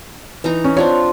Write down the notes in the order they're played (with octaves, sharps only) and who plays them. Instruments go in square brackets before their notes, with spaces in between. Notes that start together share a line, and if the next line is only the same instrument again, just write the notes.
[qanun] E3 D#4 A#5
[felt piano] C#4
[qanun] C4 D4 F4 [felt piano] C#5